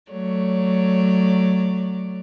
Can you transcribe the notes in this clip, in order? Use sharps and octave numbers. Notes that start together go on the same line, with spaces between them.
F#3 A3 C#5 D5